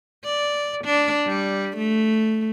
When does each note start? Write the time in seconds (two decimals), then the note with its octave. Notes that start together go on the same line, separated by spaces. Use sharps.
0.25 D5
0.85 D4
1.26 G3
1.77 A3